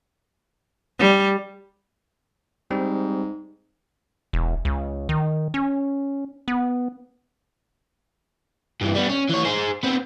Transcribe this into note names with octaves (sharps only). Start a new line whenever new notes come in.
G3
G#2 G3 C4
E1
C#2
D#3
C#4
B3
G2 E3
G3 B3
C#4
E3 C#5
G#4 C5
B3 C4